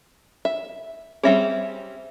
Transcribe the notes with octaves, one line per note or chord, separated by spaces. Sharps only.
E5
G3 C4 C#4 G#4 E5